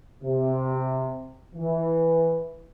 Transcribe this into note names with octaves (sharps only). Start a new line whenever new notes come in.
C3
E3